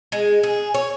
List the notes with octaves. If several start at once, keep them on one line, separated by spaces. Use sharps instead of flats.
G#3
G#4
C#5